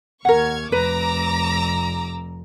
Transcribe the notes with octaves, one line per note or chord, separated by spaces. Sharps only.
D#2 A#4 F#5 C#6 F6 G#6
F1 B4 A#5 D6 E6